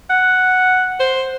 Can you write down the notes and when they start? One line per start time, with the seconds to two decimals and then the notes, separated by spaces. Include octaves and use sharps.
0.10 F#5
1.00 C5